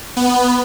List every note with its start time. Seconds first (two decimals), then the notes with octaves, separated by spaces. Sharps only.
0.17 B3